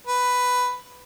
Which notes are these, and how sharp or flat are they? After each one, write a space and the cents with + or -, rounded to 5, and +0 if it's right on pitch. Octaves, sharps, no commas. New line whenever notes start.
B4 +5